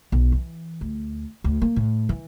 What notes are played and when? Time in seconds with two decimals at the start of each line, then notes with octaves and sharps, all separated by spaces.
0.12 B1
0.32 E3
0.81 D2
1.44 D2
1.62 A#3
1.76 A2
2.09 E3